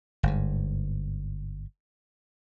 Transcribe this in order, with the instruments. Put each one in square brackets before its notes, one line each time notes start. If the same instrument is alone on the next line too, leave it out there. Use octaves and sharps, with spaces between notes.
[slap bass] G1 G#2